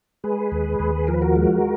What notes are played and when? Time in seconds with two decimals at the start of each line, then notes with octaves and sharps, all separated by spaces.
0.24 G#3 G#4 B4
0.52 D#2
0.80 D#2
1.07 F3 A#4
1.14 B4
1.22 F#4 A#4
1.36 G#3